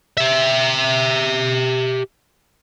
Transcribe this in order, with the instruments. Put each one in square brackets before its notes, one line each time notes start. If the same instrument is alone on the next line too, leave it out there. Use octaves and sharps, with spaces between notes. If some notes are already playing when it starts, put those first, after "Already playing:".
[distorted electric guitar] G4 E5